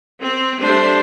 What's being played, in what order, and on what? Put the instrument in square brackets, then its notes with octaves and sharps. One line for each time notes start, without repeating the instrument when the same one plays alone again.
[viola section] C4
G3 A3 D4 C5